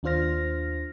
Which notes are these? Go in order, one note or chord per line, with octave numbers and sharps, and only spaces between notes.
D#2 D4 F4 C5 F6 A#6